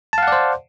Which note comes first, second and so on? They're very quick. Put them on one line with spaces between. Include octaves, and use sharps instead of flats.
A5 F5 F#5 D5 C5